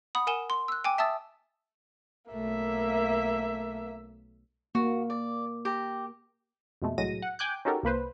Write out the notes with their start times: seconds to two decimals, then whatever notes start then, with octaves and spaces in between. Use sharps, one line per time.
0.15 F#5 B5 D#6
0.27 A#4 F#5 G#5 E7 G7
0.50 C6
0.68 E6 F#6
0.84 G5 G#5 D6
0.98 E5 A5 D#6 E6 A6
2.31 B1 A3 A#3 E5
4.75 A#3 F#4
5.10 D5
5.65 G4 A#5
6.82 F2 B2 G#3 A3
6.98 C2 A2 F#3 G#3 A#6 D#7
7.22 F#5
7.39 G5 G#5 D6 F#6 G6
7.65 C#4 D#4 F#4 G4 A4 A#4
7.83 C2 A#3 B4 C5